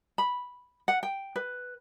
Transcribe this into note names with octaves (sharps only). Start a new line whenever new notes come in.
B5
F#5
G5
B4